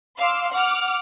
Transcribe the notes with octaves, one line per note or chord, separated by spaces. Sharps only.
F5 C6 D6 E6
F#5 D6 F6